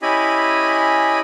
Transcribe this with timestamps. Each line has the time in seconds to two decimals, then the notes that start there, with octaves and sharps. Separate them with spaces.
0.02 C#4 E4 G4 D#5 G#5 B5